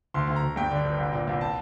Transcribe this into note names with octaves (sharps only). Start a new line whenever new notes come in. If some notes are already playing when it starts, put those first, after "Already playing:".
D2 C6
D2
A#5
D2
G2 G5
D3
G1
C2
A#2
C2
A5